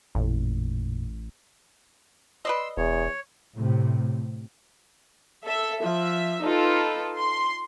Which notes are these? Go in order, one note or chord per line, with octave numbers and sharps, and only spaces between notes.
A1 F2 A#2
B4 D5 D#5 C6 E6
E1 E2 C#5
A2 C3
A4 E5
F3 E5
D#4 F4 A4 B4
C6